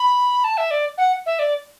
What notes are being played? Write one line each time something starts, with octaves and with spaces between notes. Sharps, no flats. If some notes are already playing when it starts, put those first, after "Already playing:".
Already playing: B5
A5
E5
D5
F#5
E5
D5